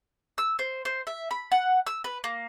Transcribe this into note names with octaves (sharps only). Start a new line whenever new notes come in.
E6
C5
C5
E5
B5
F#5
E6
B4
A#3